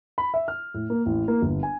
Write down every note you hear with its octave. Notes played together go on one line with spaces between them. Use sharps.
B5
E5
F6
A2
A#3
A1
A#3
G1
G#5